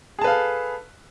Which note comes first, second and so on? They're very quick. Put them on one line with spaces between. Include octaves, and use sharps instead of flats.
G#4 A5 B4 F5 A4